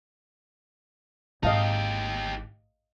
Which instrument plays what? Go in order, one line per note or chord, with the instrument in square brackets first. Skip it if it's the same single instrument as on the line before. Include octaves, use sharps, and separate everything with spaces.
[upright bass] G#1 [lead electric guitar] D#4 G4 [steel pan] D#5 F5 A5